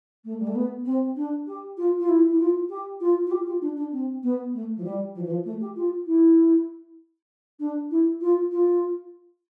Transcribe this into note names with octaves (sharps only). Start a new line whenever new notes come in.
A3
G3
A3
B3
C4
D4
G4
F4
F4
E4
E4
F4
G4
F4
F4
G4
F4
D4
D4
C4
B3
A3
F3
G3
F3
E3
F3
A3
G4
F4
E4
D4
E4
F4
F4